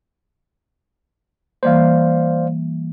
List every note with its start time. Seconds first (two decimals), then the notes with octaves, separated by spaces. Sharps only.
1.63 E3 G3 A#3 C5 D5 F5